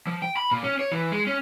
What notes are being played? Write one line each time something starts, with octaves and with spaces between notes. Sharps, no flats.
F3
G5
B5
A#2
C#4
C#5
E3
G#3
C#4